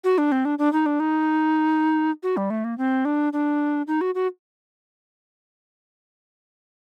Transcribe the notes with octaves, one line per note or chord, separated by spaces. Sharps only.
F#4
D4
C4
D4
D4
D#4
D4
D#4
F#4
G3
A3
A#3
C4
D4
D4
D#4
F#4
F#4